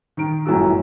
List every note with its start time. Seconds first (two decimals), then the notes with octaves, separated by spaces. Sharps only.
0.17 D#3 D7
0.46 G1 F#2 A2 E3 F#4 E6